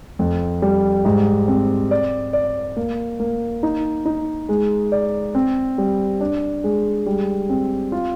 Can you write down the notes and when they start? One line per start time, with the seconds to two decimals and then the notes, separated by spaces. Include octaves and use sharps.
0.19 F2
0.62 G3
1.05 G#2
1.48 C4
1.91 D5
2.33 D5
2.77 A#3
3.20 A#3
3.63 D#4
4.06 D#4
4.49 G#3
4.92 D5
5.35 C4
5.78 G3
6.20 D4
6.64 G#3
7.06 G3
7.49 C4
7.92 F4